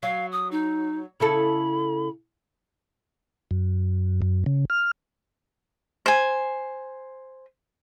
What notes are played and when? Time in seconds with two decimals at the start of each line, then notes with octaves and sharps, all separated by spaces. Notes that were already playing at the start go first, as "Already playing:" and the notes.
0.03 F#3 F5
0.32 D#6
0.52 D#4
1.20 C#3 E4 A4 B5
3.51 F#2
4.22 F#2
4.46 C#3
4.70 F6
6.06 C5 G#5